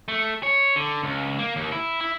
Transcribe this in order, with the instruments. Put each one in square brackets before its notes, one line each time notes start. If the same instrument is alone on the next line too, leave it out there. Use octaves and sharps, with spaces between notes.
[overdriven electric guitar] A3
C#5
D3
C#2
A#3
D#2
E4
E4